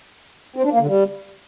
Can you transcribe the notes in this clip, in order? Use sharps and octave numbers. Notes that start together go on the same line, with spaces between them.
C4
D4
A#3
D3
G3